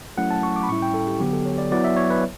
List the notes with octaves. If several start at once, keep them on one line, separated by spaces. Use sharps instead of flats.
F#3 A3 C#4 E4 F#5
A5
C#6
D6
B5
A2 G3 C#4 E4 C#6
G5
A4
G4
D3 F#3 B3 G4
A4
C#5
D5
F#3 B3 E4 D5
E5
C#5
B4